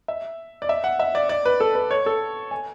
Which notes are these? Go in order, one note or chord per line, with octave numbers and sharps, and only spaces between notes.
E5
D5
E5
F#5
E5
D5
D5
B4
A4
B4
C#5
A4
G#5